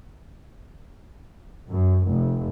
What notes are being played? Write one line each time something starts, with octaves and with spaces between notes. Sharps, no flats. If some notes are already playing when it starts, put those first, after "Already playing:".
F#2
F1